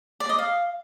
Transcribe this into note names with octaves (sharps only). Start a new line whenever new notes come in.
D5
D#5
F5